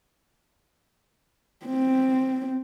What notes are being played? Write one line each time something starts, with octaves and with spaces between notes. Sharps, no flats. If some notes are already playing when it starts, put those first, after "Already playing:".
C4